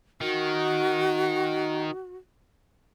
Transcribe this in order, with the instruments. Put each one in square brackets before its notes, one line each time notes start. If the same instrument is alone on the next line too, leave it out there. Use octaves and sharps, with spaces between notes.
[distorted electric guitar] D#3 [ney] F#4